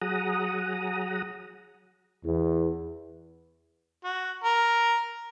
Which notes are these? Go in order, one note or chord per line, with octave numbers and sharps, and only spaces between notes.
F#3 G#4 F#5 A#5 D#6
E2
F#4
A#4